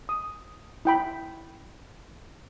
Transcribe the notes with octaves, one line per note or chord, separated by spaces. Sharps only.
D#6
E4 G5 B5